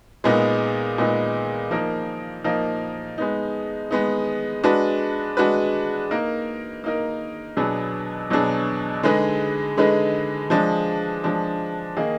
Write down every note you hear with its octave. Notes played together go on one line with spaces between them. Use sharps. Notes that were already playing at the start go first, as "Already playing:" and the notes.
A#2 G#3 B3 D#4
A#2 G#3 B3 D#4
F3 A#3 D#4 A#4
F3 A#3 D#4 A#4
G#3 B3 D#4
G#3 B3 D#4
G#3 D4 F#4 B4
G#3 D4 F#4 B4
A#3 D#4 A#4
A#3 D#4 A#4
B2 F#3 B3 D4 G#4
B2 F#3 B3 D4 G#4
D3 G#3 D#4 G#4 B4
D3 G#3 D#4 G#4 B4
F3 G#3 D4
F3 G#3 D4
D#3 A#3 D#4 G#4